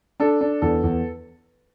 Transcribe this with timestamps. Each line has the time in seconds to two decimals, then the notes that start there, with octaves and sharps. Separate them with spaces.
0.20 D4 A4
0.41 D4
0.62 E2 A4
0.83 E2